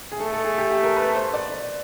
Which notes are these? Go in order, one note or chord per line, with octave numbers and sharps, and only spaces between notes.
G#4
A3 A4
A4
G#4
G4
G4
A#4
B4
C5
D5